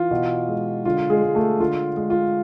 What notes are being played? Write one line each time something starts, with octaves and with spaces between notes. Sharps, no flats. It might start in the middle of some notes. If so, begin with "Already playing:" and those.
Already playing: E3 F4
B2
G#3
D3 F4
G#3 G#4
G#3
A3 A4
D3 F4
G#3
F4